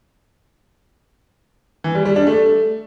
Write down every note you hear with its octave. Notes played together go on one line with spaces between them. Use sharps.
E3
G3
G3
D4
A3